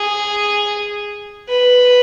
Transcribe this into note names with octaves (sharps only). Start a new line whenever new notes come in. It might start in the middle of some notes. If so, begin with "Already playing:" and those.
Already playing: G#4
B4